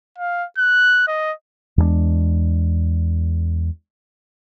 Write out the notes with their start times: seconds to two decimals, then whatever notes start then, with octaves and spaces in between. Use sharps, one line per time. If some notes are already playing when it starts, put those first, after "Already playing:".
0.18 F5
0.58 F#6
1.08 D#5
1.78 E2 G#3 B3 D4